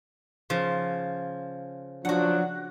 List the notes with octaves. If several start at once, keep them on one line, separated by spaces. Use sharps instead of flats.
C#3 F3
F3 F#3 D4 F#4 F#5